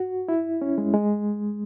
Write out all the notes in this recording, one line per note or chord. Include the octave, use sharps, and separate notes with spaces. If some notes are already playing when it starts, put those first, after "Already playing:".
Already playing: F#4
E4
C#4
G#3
G#3